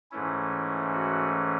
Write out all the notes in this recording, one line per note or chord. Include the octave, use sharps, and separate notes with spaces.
G#2 E3 A3 C#4 E4
F#4